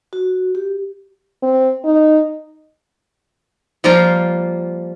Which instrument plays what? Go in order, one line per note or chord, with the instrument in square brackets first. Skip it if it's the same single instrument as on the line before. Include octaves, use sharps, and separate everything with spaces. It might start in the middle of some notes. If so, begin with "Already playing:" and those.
[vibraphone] F#4
G4
[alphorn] C4
D#4
[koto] F3 G3 A#3 F4 G5 A#5